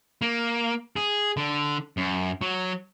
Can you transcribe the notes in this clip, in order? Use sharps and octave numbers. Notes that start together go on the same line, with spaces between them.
A#3
G#4
D3
F#2
F#3